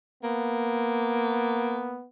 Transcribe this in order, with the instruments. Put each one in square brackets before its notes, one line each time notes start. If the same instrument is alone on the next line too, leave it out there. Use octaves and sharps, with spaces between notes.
[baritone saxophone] A#3 [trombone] B3